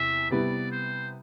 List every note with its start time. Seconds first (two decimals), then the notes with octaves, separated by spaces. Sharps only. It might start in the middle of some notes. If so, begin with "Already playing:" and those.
Already playing: E2 C3 E3 E5
0.30 C3 G3 B3 E4 D5
0.72 C5